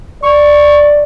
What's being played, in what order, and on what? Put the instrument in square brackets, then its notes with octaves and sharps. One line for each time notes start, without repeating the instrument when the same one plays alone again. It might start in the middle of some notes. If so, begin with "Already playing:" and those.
[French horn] D5 [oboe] C#6